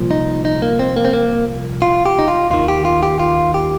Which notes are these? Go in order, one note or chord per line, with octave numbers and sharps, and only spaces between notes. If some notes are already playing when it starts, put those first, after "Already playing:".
Already playing: C2 A#2 F3
D#4
D#4
A#3
C4
A#3
C4
A#3
F4
G4
D#4
F4
D#2 D#3 F4
G4
F4
G4
F4
G4